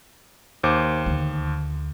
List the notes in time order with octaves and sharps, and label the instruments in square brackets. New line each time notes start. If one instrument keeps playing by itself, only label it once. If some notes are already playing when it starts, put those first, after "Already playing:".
[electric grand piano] D#2 C5 D6
[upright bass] D2